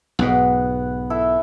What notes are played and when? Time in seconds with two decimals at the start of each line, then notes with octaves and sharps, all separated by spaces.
0.19 B1 G#2 B3 F#5
1.10 E4 A4 E5